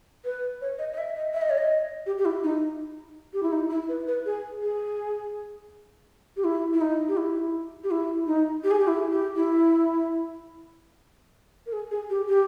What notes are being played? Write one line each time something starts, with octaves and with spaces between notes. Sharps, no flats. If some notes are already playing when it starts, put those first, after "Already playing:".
B4
C#5
D#5
D#5
E5
D#5
E5
D#5
C#5
D#5
G4
G4
E4
D#4
G4
E4
D#4
E4
B4
B4
G#4
G#4
G4
E4
E4
D#4
G4
E4
G4
E4
D#4
G4
G#4
G4
E4
G4
E4
A#4
G#4
G#4
G4
G4